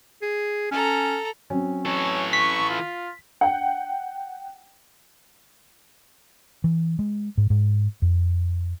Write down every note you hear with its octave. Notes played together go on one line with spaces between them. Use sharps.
G#4
C#4 A4 A#5
F#3 C4 C#4
E3 A4 C#5
C#6 B6
F4
F#5 G5
E3
G#3
G#2
G#2
F2